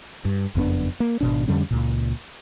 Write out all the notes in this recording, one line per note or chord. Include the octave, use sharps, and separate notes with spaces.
G2
F#1 F2 B3 D4
A#3
G#1 B2 D4
F2 D3 G3 C#4
C#2 A#2